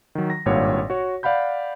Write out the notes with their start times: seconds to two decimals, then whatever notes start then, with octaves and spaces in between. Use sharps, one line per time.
0.15 D#3 F#3
0.30 A#6
0.46 G#1 G2 A#2 C#5 F5 F#5
0.90 F#4 C#5
1.23 D5 F5 F#5 B5 G6